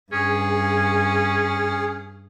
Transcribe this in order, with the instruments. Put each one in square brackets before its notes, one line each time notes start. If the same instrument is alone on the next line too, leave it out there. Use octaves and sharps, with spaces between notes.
[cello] G2 [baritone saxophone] C#4 [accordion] G#4